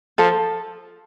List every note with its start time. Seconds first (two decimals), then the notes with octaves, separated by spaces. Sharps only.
0.18 F3 A4